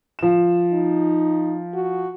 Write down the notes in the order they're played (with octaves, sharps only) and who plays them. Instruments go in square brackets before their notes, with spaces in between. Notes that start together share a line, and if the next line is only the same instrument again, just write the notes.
[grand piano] F3 E7
[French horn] D#4
F#4